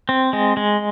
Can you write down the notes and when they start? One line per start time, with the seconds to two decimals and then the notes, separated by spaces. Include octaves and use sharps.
0.09 C4
0.33 G#3
0.57 G#3